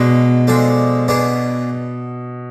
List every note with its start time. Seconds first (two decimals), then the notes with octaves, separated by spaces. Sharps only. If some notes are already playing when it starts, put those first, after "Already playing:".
Already playing: B2 G#3 D4 G#4
0.47 F3 G#3 D4 A4 D5
1.08 B2 B3 D4 G#4 D5